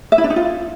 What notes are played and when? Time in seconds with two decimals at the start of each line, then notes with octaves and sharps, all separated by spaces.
0.12 E5
0.18 E4
0.24 D4
0.30 D#4
0.36 F4